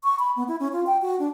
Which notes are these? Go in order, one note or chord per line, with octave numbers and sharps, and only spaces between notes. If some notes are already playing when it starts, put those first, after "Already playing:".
C#6
B5
B3
E4
C#4
F4
G5
F#4
D4